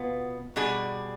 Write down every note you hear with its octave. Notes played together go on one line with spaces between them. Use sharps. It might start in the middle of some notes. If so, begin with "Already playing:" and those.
Already playing: B2 B3 F4
B2 G3 D4 G#4